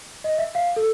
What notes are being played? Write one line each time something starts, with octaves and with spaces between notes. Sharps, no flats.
D#5
E5
F5
A4